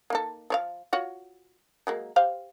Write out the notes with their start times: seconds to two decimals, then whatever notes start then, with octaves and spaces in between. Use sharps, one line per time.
0.10 A#3 D#4 A4
0.50 F3 C#5 F5
0.93 F4 F#4 C#5
1.87 F#3 G#3 A#3
2.16 G4 C5 F5